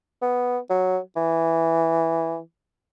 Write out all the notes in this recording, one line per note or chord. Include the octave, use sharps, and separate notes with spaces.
B3
F#3
E3